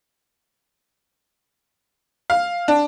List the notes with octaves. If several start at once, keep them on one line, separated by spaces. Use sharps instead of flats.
F5
D4